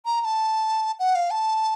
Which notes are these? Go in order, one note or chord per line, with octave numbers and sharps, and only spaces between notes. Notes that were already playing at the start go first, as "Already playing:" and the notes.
A#5
A#5
A5
F#5
F5
A5